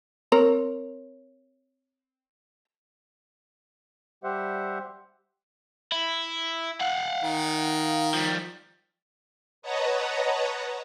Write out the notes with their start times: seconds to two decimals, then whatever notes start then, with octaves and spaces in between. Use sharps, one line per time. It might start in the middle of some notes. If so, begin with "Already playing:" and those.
0.32 C4 A#4 C#5
4.24 G3 G4 C5 E5 F#5
5.92 E4
6.81 F5 F#5
7.24 D#3
8.14 F3 G3
9.62 B4 C#5 D#5 F#5 A5 A#5